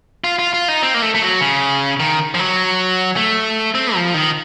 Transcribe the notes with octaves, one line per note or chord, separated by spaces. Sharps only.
F4
F4
F4
D#4
C4
A#3
A3
A3
F#3
C#3
D#3
F3
F#3
A3
C4
F3
D#3